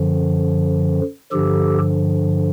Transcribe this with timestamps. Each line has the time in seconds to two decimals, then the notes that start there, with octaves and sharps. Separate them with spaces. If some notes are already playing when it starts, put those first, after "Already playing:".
Already playing: F#2 D3 F3
1.32 G2 D3 F3 G4 A4